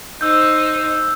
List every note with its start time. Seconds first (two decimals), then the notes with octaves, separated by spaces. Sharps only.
0.21 D#4 C5 E6 G6